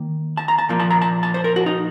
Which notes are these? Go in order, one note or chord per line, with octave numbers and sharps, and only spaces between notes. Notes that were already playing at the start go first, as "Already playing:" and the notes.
Already playing: D#3 A#3
A5
A#5
A5
A#2 F3 A#3
A5
A#5
A5
A5
C5
A#4
F#4
D#4